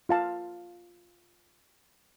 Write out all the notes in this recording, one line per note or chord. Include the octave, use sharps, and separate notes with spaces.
F4 F5 A5